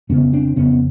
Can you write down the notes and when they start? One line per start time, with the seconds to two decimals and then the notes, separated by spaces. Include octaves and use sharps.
0.09 F2 C#3 B3 C#4
0.33 C4 D4
0.56 F2 C#3 B3 C#4